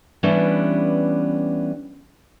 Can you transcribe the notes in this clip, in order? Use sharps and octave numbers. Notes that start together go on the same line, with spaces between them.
E3 G3 B3 C#4 D4